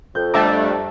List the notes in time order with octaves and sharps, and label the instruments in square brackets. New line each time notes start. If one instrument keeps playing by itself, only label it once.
[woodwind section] F2 [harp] G6
[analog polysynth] G3 A3 D4 [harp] E5 A5 A#5